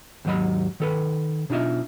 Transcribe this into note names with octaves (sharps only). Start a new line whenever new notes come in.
D#2 G#2 F#3 D#5 B5
D#3 A4 B4
B2 D4 D#4 F4 D#5 E5